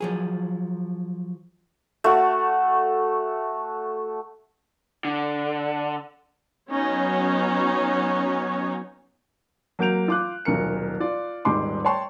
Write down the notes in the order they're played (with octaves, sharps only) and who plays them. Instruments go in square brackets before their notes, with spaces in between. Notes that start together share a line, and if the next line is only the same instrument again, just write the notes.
[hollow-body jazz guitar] F3 F#3 G#4
[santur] A3 F#4
[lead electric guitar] D3
[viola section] F#3 B3 C#4 D#4 C#5
[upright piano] F#3 A#3 F#4 G6 D7 F7
F4 D6 F#6
D#1 B1 A#4 C#7
F4 D5
D#1 G#2 G3 C6 D6
C#5 G5 A5 C6 C#6